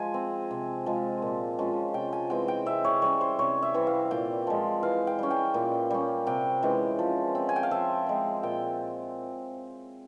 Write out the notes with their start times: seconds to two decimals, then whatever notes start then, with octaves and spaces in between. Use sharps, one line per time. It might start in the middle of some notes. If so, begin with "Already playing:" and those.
Already playing: F3 G#3 G#5
0.14 C4
0.51 C3
0.86 F3 G#3
1.22 A#2
1.59 F3 G#3 C#4
1.94 C3 G5
2.13 G#5
2.30 E3 G#3 C4 G5
2.48 G5
2.66 C3 E5
2.84 C#5
3.02 G3 C#4 C#5
3.21 C5
3.39 C3 C#5
3.62 E5
3.74 E3 G3 C4
3.87 F5
4.11 A#2 G5
4.47 F3 G#3
4.83 E3 F5
5.07 G5
5.19 G3 C#4
5.31 G5
5.54 A#2
5.91 G3 C#4
6.27 C3 G5
6.62 E3 G#3 C#4
6.99 F3
7.35 C4
7.49 G#5
7.56 G5
7.63 F5
7.71 F3 E5
8.06 G#3 C4
8.43 A#2 G5